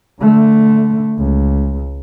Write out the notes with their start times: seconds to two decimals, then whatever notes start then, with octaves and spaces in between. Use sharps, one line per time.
0.21 D3 A3
1.18 C#2